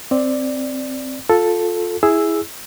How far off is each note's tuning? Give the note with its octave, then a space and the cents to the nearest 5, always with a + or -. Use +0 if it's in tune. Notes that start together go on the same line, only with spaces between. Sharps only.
C4 +0 D5 +0
F4 +20 A4 +0
E4 +0 G#4 +0 E6 +0